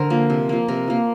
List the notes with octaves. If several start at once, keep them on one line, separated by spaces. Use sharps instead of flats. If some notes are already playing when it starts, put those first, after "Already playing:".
Already playing: D3 A#4 C5
F3 A#3
C3
F3 A#3
C3 A#4
F3 A#3